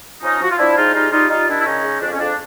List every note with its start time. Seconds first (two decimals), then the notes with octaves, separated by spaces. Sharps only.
0.22 F3 C#4 D#4
0.41 F3 F#4
0.50 F4
0.58 F3 D4 E4
0.76 G#3 D#4 F4
0.94 G3 D#4 F4
1.12 G3 D#4 F4
1.30 G3 D#4 F4
1.48 D#3 D4 E4
1.60 E4
1.65 C#3 C#4 D#4
1.83 G#3
2.01 F2 D4
2.12 C#4
2.19 F2 D4